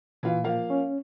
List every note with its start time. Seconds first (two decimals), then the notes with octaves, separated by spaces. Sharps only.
0.23 A#2 E3 F4
0.44 F3 A#3 F5
0.70 C#4